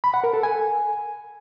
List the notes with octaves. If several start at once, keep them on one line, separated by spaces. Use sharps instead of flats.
B5
F#5
A#4
A4
G#5